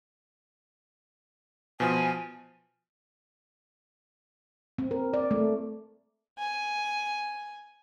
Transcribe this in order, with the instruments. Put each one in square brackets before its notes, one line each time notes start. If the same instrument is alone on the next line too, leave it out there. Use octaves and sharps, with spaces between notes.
[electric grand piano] B2 F3 [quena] G#5
[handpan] C4
A#4
D5
A3
[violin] G#5